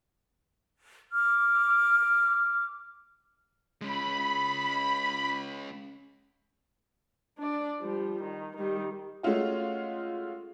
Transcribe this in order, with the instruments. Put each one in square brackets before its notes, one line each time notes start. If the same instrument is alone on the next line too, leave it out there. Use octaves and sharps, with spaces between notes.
[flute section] D6 F6
[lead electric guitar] G#3 C#4 [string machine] B5
[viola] D4 D5
F3 G3
D#3
D#3 G3
[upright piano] G#3 A3 C#4 F4 F#4